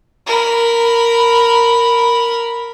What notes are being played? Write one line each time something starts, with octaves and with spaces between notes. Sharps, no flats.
A#4 B5